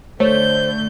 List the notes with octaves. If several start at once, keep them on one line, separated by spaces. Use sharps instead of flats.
D3 A3 C5 C#5 G6